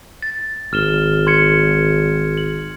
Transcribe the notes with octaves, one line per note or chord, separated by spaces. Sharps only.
A6
G#1 F6 E7 G7
C6 G#6 C#7
F#7